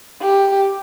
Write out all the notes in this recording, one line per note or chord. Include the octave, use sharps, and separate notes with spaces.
G4